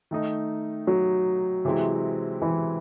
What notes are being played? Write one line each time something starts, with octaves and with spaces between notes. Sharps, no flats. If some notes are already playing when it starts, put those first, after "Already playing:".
D#3 A3 D#4
F#3
C3 E3 G#3 C4 E4
E3